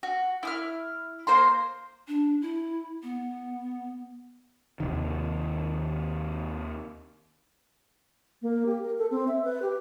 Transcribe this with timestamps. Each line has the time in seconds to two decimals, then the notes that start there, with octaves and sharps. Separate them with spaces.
0.03 F#4
0.43 E4 D#6 F6
1.27 A#3 C5 A#5 C6
2.08 D4
2.42 E4
3.03 B3
4.80 D#2 C3 D#3
8.42 A#3
8.66 G4
8.82 A#4
8.98 A4
9.11 C4
9.28 E5
9.44 B4
9.62 G4